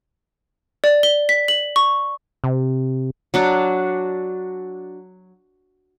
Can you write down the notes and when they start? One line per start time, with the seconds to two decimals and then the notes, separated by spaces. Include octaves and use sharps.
0.84 D5
1.03 G7
1.29 B6
1.48 F#7
1.76 C#6
2.44 C3
3.34 F#3 D4 F#4